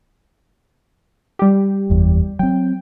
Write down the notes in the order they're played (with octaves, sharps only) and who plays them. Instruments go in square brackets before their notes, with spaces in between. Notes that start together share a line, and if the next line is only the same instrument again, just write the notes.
[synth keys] G3 G4
[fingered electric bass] F#1 E2
[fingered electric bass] F#3 C4 [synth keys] G5